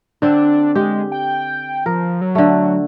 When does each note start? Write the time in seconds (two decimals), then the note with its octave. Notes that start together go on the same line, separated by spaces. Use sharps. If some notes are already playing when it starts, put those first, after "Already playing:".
0.22 D3 C4 D4
0.75 G#3 G4
1.12 G5
1.86 F3 A#4
2.21 F#3
2.35 D3 A3